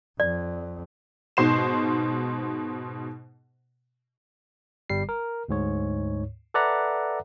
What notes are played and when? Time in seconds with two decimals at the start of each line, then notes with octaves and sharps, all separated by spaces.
0.20 F2 D5
1.37 G#2 B2 C5 C7 E7
4.90 G1 G3 C7
5.09 A#4
5.49 D2 G#2 C#5
6.54 A4 B4 D5 E5 F#5 A#5